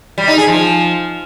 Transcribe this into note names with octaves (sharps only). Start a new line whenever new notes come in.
G3
D#4
G#4
F3